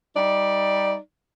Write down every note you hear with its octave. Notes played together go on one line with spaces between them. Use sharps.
G3 D#4 D5